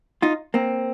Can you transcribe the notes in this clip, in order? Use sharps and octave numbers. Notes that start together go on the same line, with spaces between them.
D#4 F4
A#3 C4